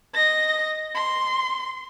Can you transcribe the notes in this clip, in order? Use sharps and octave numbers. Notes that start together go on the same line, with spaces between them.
D#5 A#6
C6